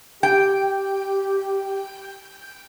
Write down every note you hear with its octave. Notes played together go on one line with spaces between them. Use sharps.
G4 G5